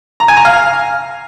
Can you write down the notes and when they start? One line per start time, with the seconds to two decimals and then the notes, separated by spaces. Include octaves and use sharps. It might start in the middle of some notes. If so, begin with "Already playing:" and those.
0.20 A#5
0.28 G#5
0.37 A#5
0.45 F5